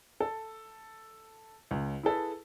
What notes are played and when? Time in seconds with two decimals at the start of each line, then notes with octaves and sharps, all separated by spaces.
0.20 A4
1.71 C#2
2.03 E4 G#4 A4 B4